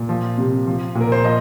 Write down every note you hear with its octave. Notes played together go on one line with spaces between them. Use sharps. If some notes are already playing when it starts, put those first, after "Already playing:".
Already playing: A#2
F3
C3
F3
A#2
A#4
C5
F3 D#5